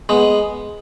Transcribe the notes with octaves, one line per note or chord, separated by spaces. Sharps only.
G#3 B3